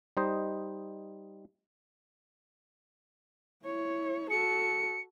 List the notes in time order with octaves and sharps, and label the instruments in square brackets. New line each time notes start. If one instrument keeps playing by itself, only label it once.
[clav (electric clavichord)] G3 D#4 C5 D#5
[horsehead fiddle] E4 C#5
[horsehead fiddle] F#4 A4 [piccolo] C#7